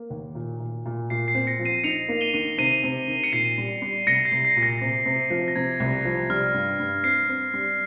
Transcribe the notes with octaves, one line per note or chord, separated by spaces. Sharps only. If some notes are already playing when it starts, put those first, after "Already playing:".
Already playing: A#3
D#2
A#2
A#2
A#2
A#2 C7
C7
C4
A#6 C#7
F3
C7 D#7
D#4 C#7 F7
A#3
D#7 G7
D#3
C3 C7 D#7
C3
D#3
C#7
A#2 C7 D#7
G3
G3
C2 A#6 C#7
C7
C2
C7
A#2
A#6
C3
C3
F3
A#6
C3 G#6
C2
F3
G3 F6
G2
G2
C4 C7
C4
G3